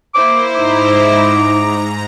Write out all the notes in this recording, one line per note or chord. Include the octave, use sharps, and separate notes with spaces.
A#3 E4 C5 D6
G#2 D#4 A#5 D6